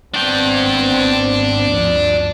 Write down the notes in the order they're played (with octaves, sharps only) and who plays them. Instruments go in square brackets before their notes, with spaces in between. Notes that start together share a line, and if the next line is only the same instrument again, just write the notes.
[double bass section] G#1 B3 C4 [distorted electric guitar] D4 G5
[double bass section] D2 G2 F3